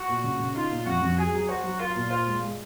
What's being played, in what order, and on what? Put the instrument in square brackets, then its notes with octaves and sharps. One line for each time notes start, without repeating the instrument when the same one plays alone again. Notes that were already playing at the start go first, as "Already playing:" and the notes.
Already playing: [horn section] F#4
[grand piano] A#2
C#3
C#3
[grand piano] D#4 [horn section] F4
[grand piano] A#2
[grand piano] F2 [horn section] F#4
[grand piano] F2
[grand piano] F#4 [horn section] G#4
[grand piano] F#3
[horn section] F#4 [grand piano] C5
[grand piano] F#3
[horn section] F4 [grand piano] A#4
[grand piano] A#2
[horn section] F4 [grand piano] C5
[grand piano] G#3
G#3